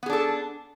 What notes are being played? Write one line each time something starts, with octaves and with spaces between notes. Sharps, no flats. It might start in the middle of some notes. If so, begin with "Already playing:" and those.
B3 D4 G#4 A4